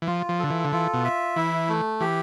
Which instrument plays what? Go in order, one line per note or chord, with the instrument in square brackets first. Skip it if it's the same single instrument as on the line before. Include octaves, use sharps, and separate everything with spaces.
[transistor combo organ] E3
[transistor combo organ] F3 [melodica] F4
[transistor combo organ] F3
[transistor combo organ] D3 [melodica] A4
[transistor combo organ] E3
D3
[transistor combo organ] E3 [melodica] F4
[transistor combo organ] B2
[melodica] E5
[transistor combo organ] E3 [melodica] E4
[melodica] A3
[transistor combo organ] E3 [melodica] G4